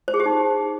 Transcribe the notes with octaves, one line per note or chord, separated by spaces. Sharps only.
C5
G#4
G4
D#4